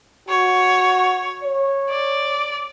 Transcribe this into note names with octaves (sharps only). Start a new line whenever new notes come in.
F#4 C#5
C#5
D5